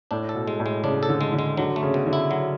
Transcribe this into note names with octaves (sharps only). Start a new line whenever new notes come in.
A2 D4
A4
B2
G#3
A2
G#3
C#3 D4
A4
D3
G#3
D3
G#3
D3 F#3
A3
C#3
B2
D3
E4
F#3